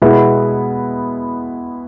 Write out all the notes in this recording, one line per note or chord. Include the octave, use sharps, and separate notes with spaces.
B2 G#3 B3 E4